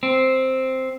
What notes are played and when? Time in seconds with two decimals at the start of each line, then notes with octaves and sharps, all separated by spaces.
0.03 C4